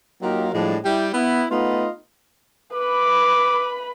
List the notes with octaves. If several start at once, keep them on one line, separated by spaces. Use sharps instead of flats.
F#3 A#3 D#4 F4 G4 A#4
A2 F3 G3 G#3 D4
G3 E4 G4 D5 G5
B3 E4
A3 B3 D#4 F4 B4 D#5
B4 B5 D6